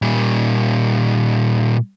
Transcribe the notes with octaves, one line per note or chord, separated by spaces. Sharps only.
A#2 G3